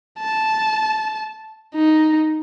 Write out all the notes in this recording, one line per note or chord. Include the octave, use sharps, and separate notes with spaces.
A5
D#4